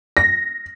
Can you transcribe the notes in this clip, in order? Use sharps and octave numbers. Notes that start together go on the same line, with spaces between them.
A#6